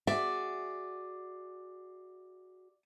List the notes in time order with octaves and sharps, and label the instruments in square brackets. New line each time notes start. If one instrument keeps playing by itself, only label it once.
[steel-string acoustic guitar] F#4 G#4 [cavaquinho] D5 [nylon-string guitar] E5